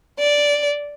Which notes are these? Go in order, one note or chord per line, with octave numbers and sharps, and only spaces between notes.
D5